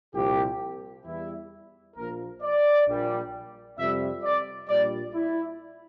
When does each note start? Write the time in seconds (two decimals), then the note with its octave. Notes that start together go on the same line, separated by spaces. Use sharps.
0.14 C2 A#2 F3 G4
1.05 E2 E3 G3 E4
1.96 A#1 A#2 F3 A#4
2.42 D5
2.87 A#1 A#2 G3
3.78 F2 C3 G3 E5
4.24 D5
4.69 A#1 A#2 G3 D5
5.14 E4